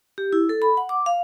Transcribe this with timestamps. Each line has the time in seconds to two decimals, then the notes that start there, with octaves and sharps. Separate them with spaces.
0.18 G4
0.33 E4
0.49 A4
0.62 B5
0.77 F#5
0.89 D6
1.06 F5